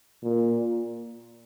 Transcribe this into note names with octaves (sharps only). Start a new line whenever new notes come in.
A#2